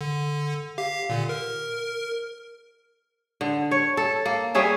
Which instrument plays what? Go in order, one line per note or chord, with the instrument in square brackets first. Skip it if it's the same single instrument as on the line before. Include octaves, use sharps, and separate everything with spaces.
[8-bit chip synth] D3
G4 F5
A#2 D3
A#4
[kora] D3
C#5
A4
A#3
G3 C#4 G#4 E5